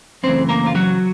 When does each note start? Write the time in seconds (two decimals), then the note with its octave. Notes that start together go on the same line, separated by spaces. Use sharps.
0.23 F#2 C#3 E3 A3 C4 C5
0.49 A#3 A#4
0.66 F4
0.75 F#3 F#4